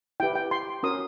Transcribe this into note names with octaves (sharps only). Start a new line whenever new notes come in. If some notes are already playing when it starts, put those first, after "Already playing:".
E4 G4 B4 G5
G5
C6
C#4 F#4 A#4 C#5 D#6